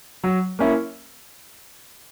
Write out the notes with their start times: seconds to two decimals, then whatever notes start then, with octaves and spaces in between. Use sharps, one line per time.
0.24 F#3
0.59 A#3 C#4 E4